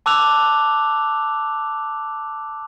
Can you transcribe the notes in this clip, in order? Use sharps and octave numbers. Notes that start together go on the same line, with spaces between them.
A5 D6 E6 F#6 F7